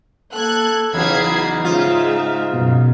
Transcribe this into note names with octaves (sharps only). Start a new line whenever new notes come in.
A#3 A4 F#6 G#6
E2 C#3 F#3 D#4 B5 G#6 C7
G#2 C#3 G#3 F4 E5
F#2 B2